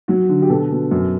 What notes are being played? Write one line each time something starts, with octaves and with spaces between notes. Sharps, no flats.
F#3 F#4
D3
G4
B2 A4
B2
F#2